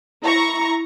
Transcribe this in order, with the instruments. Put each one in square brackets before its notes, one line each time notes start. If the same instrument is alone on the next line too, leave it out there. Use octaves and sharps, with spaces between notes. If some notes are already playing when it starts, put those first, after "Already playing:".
[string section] E4 A#5 C#6